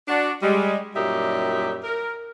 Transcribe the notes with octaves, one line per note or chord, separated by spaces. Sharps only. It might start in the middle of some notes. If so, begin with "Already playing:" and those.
D4 F#4
G3 G#3
F#2 A#2 G3 D#4 G4 E5
A#4